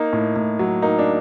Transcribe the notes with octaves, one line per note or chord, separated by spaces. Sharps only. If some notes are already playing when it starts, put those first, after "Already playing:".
Already playing: A#3 D#4
A2
A2
F#3
A#3 D#4
D4